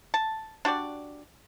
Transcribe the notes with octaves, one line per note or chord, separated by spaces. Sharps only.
A5
D4 F#4 G4 D5